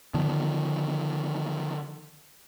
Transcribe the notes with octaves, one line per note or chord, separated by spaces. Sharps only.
D3 D#3 F3 B3